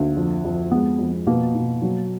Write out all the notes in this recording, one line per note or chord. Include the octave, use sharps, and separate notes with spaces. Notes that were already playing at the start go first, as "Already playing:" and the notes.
Already playing: D2 A#3
F2
F2
G#3 B3
F2
B2 A#3
B2
F#3